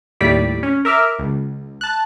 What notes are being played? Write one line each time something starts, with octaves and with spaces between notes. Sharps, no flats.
D#2 A2 G3 D5 B6 D7
C#4
A#4 E5 D6 F6
C#2
A5 F#6